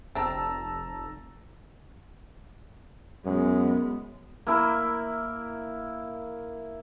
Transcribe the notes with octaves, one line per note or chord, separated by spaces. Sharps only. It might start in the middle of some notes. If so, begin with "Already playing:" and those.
F1 C4 D4 A5 A#5 E6
F#2 G#3 B3
A#3 E4 A#4